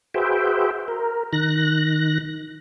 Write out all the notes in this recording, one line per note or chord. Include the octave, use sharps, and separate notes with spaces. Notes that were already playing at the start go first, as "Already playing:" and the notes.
F#4 G#4 B4 C5 E5 G5
A#4
D#3 F#6 A#6